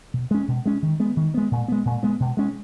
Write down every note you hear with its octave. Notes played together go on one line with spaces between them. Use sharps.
B2
G#3 C#4
B2
G#3 C#4
D#3
G#3 B3
D#3
G#3 B3
A#2
G#3 B3
A#2
G#3 B3
B2
G#3 C#4